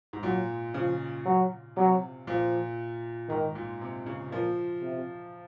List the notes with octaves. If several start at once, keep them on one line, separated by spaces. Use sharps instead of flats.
G#2
A#2 F#3
C#3 F3
F#3
C3 F#3
A#2 F3
G#2 D#3
A#2
C3
C#3
A#2 F3
C3